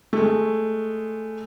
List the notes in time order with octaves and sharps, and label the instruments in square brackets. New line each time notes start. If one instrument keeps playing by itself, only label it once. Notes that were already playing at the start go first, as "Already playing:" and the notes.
[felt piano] G#3 A3